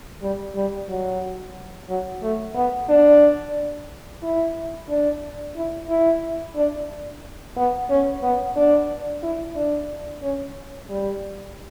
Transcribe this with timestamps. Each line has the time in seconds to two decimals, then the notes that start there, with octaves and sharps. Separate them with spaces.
0.23 G3
0.56 G3
0.89 F#3
1.90 F#3
2.22 A3
2.55 B3
2.89 D4
4.23 E4
4.89 D4
5.56 E4
5.89 E4
6.56 D4
7.57 B3
7.90 C#4
8.23 B3
8.57 D4
9.23 E4
9.56 D4
10.23 C#4
10.89 G3